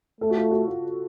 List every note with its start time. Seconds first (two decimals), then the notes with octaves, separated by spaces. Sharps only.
0.20 A3 A4
0.30 F#4
0.37 F4
0.51 F#4
0.68 F4